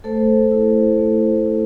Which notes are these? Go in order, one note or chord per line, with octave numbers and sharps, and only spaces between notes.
A3 A4 C5
E4
A3
E4